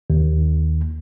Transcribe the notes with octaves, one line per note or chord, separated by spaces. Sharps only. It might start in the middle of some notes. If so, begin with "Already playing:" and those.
D#2